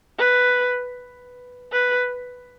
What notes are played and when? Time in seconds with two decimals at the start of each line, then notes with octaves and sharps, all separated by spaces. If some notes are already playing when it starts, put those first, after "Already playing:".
0.19 B4
1.72 B4